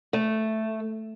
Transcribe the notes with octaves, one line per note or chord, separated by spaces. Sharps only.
A3